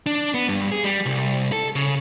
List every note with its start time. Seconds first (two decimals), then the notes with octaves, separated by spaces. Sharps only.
0.06 D4
0.34 B3
0.49 G2
0.71 G#4
0.84 G3
1.06 C2
1.52 A4
1.76 C#3